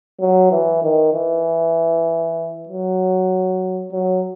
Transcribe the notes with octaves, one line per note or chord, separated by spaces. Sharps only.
F#3
E3
D#3
E3
F#3
F#3